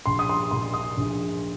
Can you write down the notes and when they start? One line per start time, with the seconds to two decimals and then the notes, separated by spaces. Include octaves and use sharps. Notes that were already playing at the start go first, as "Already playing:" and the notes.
0.06 A#1 C6
0.19 D#6
0.29 C6
0.51 A#2 C6
0.74 D#6
0.97 A#1